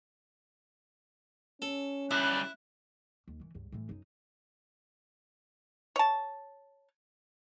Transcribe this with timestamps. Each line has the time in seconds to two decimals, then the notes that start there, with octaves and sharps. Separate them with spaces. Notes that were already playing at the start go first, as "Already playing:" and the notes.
1.62 C#4 A4
2.11 D2 G3 E4 F#6
3.28 D#2
3.40 D#3 E3
3.55 C#2 G2
3.72 A2 E3
3.89 F#2 D#4
5.96 C#5 A5